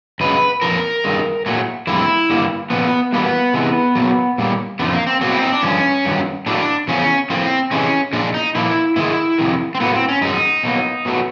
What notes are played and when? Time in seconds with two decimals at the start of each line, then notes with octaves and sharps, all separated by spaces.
0.20 F#2 C#3 G#3 B4
0.62 F2 C#3 F3 A#4
1.04 G2 D#3 G#3
1.46 A#2 F#3 A3
1.87 F2 D3 G3 A#3 E4
2.30 G2 D3 G3 A#3
2.70 A#2 F3 A3 B3
3.12 E2 B2 G3 A#3 B3
3.54 C3 E3 G#3
3.95 B2 F#3 A#3
4.38 A#2 G3 A#3
4.79 F2 D3 F3 A3 B3
4.93 A#3
5.07 C4
5.21 B2 F#3 A#3 C4
5.32 E4
5.42 D#4
5.52 D4
5.63 G2 D3 F3 C#4
6.05 G2 D#3 F#3
6.46 A2 F#3 A#3 D4
6.88 E2 C#3 F3 A3 C#4
7.30 A2 F3 A#3 C4
7.71 C3 E3 G#3 C#4
8.13 A#2 F3 G#3 D4
8.34 D#4
8.55 A#2 F3 A#3 E4
8.96 G#2 D#3 G#3 E4
9.38 F2 C3 D#3
9.75 C4
9.80 A2 F#3 A#3 B3
9.95 C4
10.09 C#4
10.21 F#2 D#3 G#3 D#4
10.63 B2 F#3 A#3
11.05 B2 F#3 A3